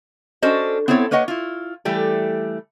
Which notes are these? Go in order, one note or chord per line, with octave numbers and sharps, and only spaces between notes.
C#4 D4 F#4 A4 C5 D#5
B3 C4 E4 A4 C#5
A#3 B4 C#5 D#5 F#5
E4 F4
E3 G3 A3 G4 A4